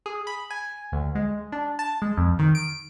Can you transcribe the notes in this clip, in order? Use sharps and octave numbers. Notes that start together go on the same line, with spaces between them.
G#4
B5
G#5
D2
G#3
D4
A5
G#3
F2
D#3
D7